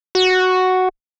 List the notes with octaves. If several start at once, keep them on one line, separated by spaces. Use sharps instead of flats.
F#4